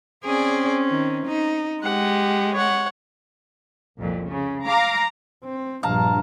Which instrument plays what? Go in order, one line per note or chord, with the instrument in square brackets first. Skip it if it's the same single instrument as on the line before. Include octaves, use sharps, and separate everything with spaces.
[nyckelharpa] C4 C#4 [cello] G#4 D5
[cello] D#3
D#4
[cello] G#3 [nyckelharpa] G4 F#5
[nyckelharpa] C#5 F#5
[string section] C2 F2 A#2
C#3
F5 A#5 D6
[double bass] C4
[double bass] A#1 G2 [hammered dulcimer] F5 A5 A#5